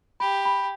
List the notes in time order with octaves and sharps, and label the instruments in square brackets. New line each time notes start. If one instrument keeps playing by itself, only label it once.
[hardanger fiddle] G4 [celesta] B5
[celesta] B5